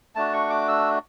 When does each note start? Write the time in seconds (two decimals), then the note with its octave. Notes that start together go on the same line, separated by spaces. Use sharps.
0.15 A3 D4 F#4 A5
0.33 C#6
0.50 D6
0.68 E6